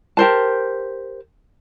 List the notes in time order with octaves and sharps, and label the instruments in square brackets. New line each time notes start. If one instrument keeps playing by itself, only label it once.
[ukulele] G4 A#4 C5 A5